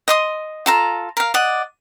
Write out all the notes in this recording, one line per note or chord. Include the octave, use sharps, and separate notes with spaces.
D#5 C6 D#6
F4 A4 A#5
A#4 F5
D5 D#5 F#5